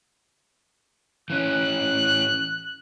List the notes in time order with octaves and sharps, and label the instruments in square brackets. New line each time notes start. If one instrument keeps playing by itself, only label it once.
[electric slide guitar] E3 C#4 [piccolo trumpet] F#6